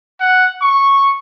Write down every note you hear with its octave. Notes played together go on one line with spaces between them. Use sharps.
F#5
C#6